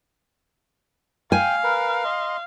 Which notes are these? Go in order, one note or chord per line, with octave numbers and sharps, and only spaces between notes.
F5 G5 G#5
A#4 B4
D#5 C6